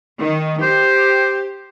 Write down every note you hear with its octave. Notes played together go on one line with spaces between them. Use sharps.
D#3
G4 C5